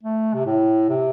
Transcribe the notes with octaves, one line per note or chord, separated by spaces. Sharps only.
A3
C3
A2
C3